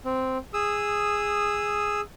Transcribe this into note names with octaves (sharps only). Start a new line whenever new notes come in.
C4
G#4 D#6 E6